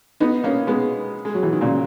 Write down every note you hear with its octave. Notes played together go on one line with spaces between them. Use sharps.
B3 D#4
A#3 C#4
G#3 B3
G#3
F#3
E3
D#3
A#2 C#3